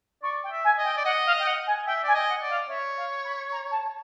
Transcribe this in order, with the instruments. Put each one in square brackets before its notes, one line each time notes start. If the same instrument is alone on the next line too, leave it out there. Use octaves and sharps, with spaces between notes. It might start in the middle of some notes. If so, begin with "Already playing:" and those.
[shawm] D5 [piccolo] C#6
[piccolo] G5
[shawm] E5
[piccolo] G#5
[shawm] D#5
[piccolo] G5
[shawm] D5
[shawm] D#5 [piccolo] F#5
[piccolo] F5
G5
F#5
G#5
[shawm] E5 [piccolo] G5
[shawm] D5 [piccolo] G#5
[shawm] D#5 [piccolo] G5
[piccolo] F#5
[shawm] D5
[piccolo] F5
[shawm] C#5 [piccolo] E5
[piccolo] F5
B5
A#5
A5